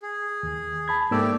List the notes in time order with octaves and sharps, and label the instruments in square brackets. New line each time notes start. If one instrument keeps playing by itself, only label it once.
[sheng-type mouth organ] G#4
[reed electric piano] D#2
A5 B5 G#6
[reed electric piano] G#2 A#3 E6 [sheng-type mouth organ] A3 G4 D5